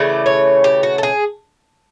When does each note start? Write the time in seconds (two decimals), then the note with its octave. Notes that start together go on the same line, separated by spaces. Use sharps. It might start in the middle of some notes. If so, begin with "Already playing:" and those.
Already playing: C#3 E3 A3 D5
0.26 C#5
0.64 G4
0.83 F#4
0.98 A4
1.03 G#4